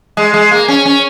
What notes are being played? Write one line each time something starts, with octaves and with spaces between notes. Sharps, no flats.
G#3
G#3
A#3
C#4
C#4